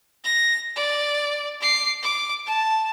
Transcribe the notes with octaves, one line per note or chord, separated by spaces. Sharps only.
A#6
D5
D6 C7
D6
A5